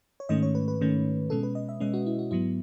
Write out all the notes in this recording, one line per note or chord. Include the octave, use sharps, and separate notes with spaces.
C#5
G#2 D#3 A3 C#4 D#5
C#5
B4
B4
G#2 D#3 A3 C#4
B2 G#3 C#4 A4
B4
D#5
E5
B2 G#3 C#4 D#5
F#4
E4
F#4
G#2 F#3 B3 E4